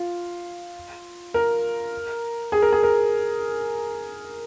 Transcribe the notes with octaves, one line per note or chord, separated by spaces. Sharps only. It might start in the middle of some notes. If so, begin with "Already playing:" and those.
Already playing: F4
A#4
G#4
A#4
G#4
A#4